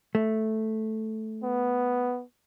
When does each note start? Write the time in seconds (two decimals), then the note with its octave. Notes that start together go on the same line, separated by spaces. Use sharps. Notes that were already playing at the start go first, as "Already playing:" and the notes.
0.15 A3
1.43 B3